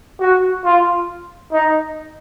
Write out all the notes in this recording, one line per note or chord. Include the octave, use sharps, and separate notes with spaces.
F#4
F4
D#4